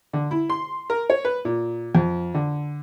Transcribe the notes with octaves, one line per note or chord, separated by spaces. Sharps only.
D3
E4
C6
A#4
C#5
B4
A#2
F2
D3